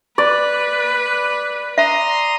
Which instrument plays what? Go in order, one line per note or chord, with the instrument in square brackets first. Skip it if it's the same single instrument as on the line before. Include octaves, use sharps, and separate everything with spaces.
[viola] B4 [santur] D5
[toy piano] E5 [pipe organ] A#5 C6 D#6